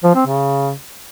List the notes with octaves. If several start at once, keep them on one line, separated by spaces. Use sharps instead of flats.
F3
C4
C#3